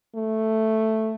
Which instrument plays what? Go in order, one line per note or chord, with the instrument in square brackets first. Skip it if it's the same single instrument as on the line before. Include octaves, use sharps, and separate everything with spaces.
[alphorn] A3